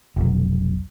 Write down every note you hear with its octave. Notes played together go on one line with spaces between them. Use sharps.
F1 B1